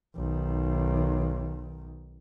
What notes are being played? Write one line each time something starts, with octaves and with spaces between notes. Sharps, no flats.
B1 D#3